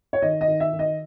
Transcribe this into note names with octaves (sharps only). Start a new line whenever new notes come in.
C#5
D#3 D#5
D#5
D#3
E5
D#3
D#5